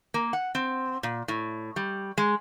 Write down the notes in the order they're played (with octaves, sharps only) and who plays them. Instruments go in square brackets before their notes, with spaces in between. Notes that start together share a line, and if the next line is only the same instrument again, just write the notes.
[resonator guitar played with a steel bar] A#3
F#5
C4
A#2
A2
G3
G#3